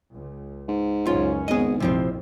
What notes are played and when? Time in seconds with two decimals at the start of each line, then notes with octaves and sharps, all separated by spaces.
0.12 C#2
0.68 G#2
1.07 C#2 F#2 C#4 F4
1.48 G#1 B3 G#4 D#5
1.80 A#1 F2 C3 F3 C4 E4